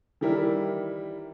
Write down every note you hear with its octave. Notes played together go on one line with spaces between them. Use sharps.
D#3 E3 G3 E4 A#4